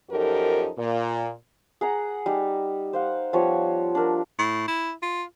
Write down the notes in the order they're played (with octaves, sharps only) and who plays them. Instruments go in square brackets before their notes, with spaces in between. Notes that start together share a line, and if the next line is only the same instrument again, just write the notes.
[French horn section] F#2 F3 D#4 G4 A4 A#4
A#2
[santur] G#4 F#5 A#5
G3 D#4
C5 F5 F#5
F3 G3 B3 C#5
D4 A#4
[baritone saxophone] A2
E4
F4